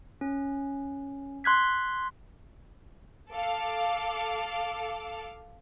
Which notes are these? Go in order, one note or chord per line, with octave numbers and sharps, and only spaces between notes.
C#4
C6 F#6 G#6 B6
A4 F5 D6